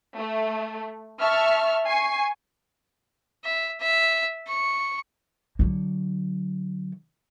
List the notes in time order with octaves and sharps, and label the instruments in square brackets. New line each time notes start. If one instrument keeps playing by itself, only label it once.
[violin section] A3
E5 A5 C#6 F6
G#5 C#6 C7
[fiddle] E5
E5
C#6
[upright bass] D3 F#3